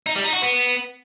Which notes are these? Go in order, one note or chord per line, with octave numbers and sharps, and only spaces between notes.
D#4
G3
D#4
F#4
B3